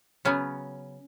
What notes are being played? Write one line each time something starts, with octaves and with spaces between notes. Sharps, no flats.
C#3 F#3 B3 C#4